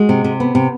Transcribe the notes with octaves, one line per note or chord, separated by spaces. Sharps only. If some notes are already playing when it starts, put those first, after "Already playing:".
Already playing: G#3 F#4
C3
C3
B3
C3